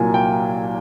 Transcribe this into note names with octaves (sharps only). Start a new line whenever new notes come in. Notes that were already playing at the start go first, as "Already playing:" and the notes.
Already playing: C2 A#2 F#3 A#3 G#5
G5